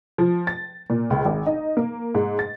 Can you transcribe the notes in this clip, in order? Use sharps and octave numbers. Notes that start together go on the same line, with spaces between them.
F3
A6
A#2
C#2
G#1
D#4
A#3
G#2
A6